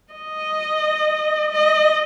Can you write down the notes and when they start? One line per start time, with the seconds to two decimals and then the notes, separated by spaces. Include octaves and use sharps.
0.13 D#5
1.52 D#5